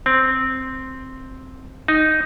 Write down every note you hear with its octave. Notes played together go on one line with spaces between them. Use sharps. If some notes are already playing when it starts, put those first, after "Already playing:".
C4
D#4